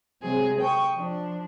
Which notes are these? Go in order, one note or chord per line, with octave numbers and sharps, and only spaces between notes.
C3 F#3 G#3 C4 G#4
G5 C#6 D#6
F3 D4